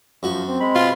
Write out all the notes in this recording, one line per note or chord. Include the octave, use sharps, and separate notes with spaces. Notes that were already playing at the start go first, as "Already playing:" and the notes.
F#2 F3 F#4
C4
G#3 B5
B2 F4